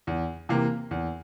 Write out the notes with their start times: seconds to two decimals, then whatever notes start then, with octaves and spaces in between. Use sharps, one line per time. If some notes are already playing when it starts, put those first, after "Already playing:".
0.07 E2
0.49 C3 E3 A#3
0.91 E2